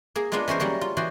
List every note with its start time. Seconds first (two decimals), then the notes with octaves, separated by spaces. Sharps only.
0.16 A#3 G#4
0.32 G#3 A#3 B3 D4 F4
0.48 E3 C#4 A#4 C5
0.60 F#3 G3 A#3 C#4
0.81 F4
0.97 E3 F#4 C5 D5 D#5